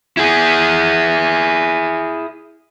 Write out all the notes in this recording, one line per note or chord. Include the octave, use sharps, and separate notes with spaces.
E4 G#4